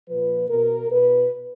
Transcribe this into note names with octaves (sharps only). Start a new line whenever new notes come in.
A#2 F3 B4
B2 A#4
B2 B4